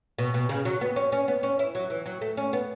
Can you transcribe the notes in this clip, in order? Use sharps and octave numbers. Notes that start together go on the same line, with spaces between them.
B2
B2
C#3
F#3
B3
C#4
C#4
B3
C#4
E4
F#3
E3
F#3
A3
C#4
B3